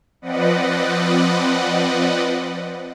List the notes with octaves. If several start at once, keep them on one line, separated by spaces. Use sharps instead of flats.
F3 C4 B4 D5 D#5 F#5